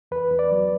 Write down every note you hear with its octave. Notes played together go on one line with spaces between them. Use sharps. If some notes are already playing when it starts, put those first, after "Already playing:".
E2 B4
E2
D5
F#3